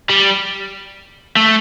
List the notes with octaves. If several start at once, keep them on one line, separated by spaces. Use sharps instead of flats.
G3
A3